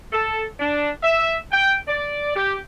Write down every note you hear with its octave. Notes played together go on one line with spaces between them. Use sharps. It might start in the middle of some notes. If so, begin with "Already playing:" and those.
A4
D4
E5
G5
D5
G4